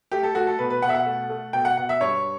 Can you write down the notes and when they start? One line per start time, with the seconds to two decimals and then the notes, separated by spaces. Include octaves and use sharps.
0.12 A3 G4
0.23 A4
0.35 A3 F#4
0.47 A4
0.59 B2 B4
0.70 B4
0.82 B2 F#5
0.89 E5
0.94 F#5
1.06 A3
1.30 A3
1.53 B2 G5
1.65 F#5
1.77 B2 F#5
1.89 E5
2.01 G2 C#5